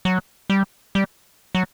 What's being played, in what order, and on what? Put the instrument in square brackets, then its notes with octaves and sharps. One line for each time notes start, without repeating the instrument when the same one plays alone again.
[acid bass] F#3
G3
G3
F#3